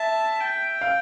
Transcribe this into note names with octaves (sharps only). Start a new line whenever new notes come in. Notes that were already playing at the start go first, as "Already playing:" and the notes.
Already playing: E5 A5
G5
F5